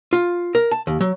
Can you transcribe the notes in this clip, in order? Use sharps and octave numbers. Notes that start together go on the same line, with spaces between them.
F4
A#4
A5
D#2
F#3